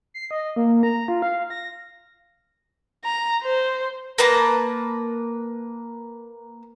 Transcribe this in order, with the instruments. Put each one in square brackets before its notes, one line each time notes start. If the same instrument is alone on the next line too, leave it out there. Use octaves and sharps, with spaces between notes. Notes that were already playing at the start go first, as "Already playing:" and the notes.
[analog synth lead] C7
D#5
A#3
A#5
F4
F5
A#6
[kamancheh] A#5
C5
[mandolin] A#3 B4 A5 A#5